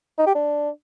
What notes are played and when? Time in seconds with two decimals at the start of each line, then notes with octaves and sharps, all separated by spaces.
0.18 D#4
0.26 G4
0.35 D4